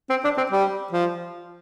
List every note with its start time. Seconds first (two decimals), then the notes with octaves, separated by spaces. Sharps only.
0.10 C4
0.24 D4
0.37 C4
0.52 G3
0.93 F3